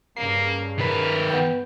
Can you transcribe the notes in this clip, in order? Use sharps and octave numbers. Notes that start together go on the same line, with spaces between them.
G2 C#3 A#3 C7
D#3 A#4 B4
B3 G5